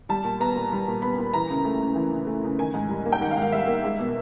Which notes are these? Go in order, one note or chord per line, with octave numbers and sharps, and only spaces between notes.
G3 A5
A#2
B3 A#5
A#2
G3
A#2
B3 B5
A#2
E3 A#5
C#3
A3
C#3
E3
C#3
A3
C#3
D#3 G#5
G#2
G3
A#3
G5
D#3 F#5
F5
G#2
F5
G3 E5
A#3
G#3
B2